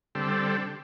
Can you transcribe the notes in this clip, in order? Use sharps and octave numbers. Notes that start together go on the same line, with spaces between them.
D3 G3 C4 A4